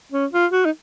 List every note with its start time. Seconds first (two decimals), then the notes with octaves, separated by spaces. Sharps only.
0.12 C#4
0.32 F4
0.52 F#4
0.65 D#4